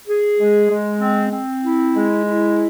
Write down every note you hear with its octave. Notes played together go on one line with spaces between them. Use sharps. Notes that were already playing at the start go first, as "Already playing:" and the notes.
G#4
G#3
G#3
C4
C4
E4
G#3
E4